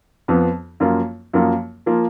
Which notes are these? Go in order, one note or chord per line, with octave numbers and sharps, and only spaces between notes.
F2 F3 B3
F#2 F3 A#3 F4
F#2 F3 A#3 F4
F3 A#3 F4